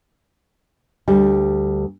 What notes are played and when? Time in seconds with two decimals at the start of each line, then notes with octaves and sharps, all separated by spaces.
1.08 D2 G3